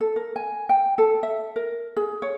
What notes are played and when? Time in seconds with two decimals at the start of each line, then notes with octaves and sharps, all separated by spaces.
0.01 A4
0.16 A#4
0.36 G#5
0.69 G5
0.98 A4
1.23 E5
1.56 A#4
1.97 G#4
2.22 C#5